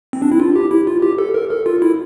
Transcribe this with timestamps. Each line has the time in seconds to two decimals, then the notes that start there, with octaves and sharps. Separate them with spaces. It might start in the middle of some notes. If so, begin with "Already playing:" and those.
0.13 C4
0.22 D4
0.32 E4
0.40 F4
0.56 G4
0.71 E4
0.87 F4
1.02 G4
1.19 A4
1.34 A#4
1.50 A4
1.66 F4
1.82 E4